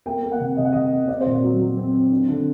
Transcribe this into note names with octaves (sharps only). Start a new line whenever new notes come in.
A#3 G5
A#3
F#5
C3
C3 D#5
F#5
C3 D#5
A#3
C4 D5
C5
A#2
D5
F#3
F#3
C4
C4
D4
D3